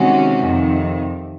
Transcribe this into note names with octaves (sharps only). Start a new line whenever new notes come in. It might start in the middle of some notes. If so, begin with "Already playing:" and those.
Already playing: C3 D#3 G#3 C#4 F#4
F2 C3 D#3